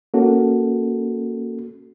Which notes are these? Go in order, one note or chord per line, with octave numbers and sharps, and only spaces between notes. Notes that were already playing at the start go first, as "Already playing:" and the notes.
A#3 C#4 F#4 A4